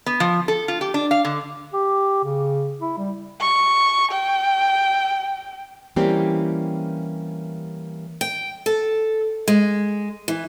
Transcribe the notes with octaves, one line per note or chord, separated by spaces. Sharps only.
B3
F3
A4
F4
G4
D4
F5
D3
G4
C#3
E4
G3
C#6
G5
E3 G3 A#3 C4 C#4 G4
G5
A4
G#3
E3